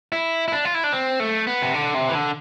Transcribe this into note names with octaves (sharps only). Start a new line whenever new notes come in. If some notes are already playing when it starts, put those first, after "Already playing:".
E4
E4
D4
F4
E4
D4
C4
A3
B3
C3
D3
C3
E3
D3